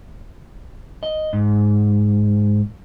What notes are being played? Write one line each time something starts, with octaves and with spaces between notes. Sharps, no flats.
D#5
G#2